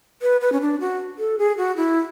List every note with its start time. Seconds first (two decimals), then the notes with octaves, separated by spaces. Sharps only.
0.22 B4
0.41 B4
0.52 C#4
0.61 D4
0.80 F#4
1.19 A4
1.39 G#4
1.57 F#4
1.77 E4